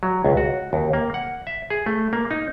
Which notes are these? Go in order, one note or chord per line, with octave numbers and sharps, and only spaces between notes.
F#3
C#2
F#4
D#2
A#3
F#5
E5
G#4
A3
A#3
D#4